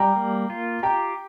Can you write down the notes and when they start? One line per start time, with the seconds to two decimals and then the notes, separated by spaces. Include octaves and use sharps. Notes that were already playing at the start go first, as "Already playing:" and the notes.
Already playing: G3 G5 A#5
0.16 A#3
0.50 F4
0.83 G4 G5 A#5